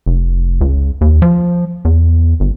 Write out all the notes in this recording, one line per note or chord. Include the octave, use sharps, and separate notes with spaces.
F1
C#2
D#2
F3
E2
G1